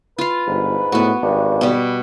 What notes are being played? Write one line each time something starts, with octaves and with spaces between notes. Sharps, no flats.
F4 B4 F5
G1 G#2
A2 B3 F#4
G#1 G2
B2 G3